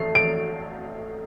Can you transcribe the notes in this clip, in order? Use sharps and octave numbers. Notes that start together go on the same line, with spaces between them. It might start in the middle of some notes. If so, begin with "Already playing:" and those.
Already playing: A3 C7
D7